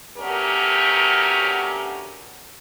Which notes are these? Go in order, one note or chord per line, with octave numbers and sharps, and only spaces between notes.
D2 F#3 B3 C#4 G4 A#4